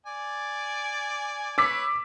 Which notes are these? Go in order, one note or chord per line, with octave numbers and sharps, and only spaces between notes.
D5 G#5
B4 C#5 D6 E6 B6